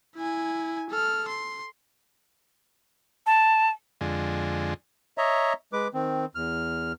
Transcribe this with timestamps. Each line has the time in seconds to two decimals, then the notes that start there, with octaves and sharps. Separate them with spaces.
0.16 E4 G#5
0.90 A4 F6
1.28 C6
3.27 A5
4.01 F2 D3 G#3
5.18 C#5 D#5 E5 A#5
5.73 G#3 B4 D6
5.94 D#3 C4
6.35 E2 F6